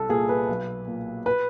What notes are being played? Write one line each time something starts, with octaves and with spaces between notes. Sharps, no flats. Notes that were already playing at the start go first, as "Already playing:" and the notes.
Already playing: C2 A4
A#2 G#4
B4
B1
A#2
B4